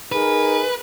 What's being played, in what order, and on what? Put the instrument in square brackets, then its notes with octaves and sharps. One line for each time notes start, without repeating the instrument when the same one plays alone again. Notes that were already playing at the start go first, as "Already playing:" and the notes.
[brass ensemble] D#4 G#4 A#4 [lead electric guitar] B4